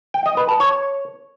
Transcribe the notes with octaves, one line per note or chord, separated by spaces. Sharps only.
G5
D#5
B4
A5
C#5